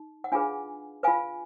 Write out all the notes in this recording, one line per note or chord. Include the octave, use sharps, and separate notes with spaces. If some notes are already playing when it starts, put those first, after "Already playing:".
Already playing: D#4
F#5
D4 F4 G#4 B4 F5 G#5
F4 B4 F5 G#5